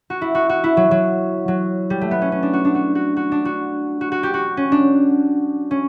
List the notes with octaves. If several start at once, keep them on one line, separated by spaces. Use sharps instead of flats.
F#4
E4
F#4
F#4
E4
F#3
F#3
F#3
G3
A3
B3
C#4
C#4
D4
F#4
D4
F#4
F#4
F#4
D4
F#4
F#4
F#4
G4
F#4
C#4
D4
C#4